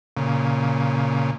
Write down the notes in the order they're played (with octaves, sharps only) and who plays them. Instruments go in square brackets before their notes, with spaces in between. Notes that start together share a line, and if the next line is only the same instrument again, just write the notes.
[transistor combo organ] A#2 C#3